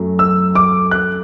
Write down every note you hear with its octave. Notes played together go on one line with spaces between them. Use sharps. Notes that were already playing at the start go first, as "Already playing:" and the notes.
Already playing: F#2 F#3 A3
E6
D6
F#6